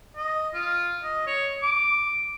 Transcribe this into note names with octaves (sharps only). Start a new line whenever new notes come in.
D#5
F4
D#5
C#5
D6